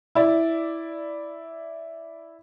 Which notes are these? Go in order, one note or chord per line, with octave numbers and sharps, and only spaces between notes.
E4 D5